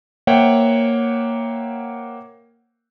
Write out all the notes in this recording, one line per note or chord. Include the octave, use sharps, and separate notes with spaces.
A#3 C5 C#5 E5 F#5 G5